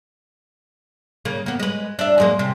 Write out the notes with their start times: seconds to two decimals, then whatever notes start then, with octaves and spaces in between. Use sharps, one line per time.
1.25 C#3 A#3
1.46 A#3 B3
1.59 G#3 B4
1.99 D4 E5
2.18 F#2 G#3 A#3
2.39 C3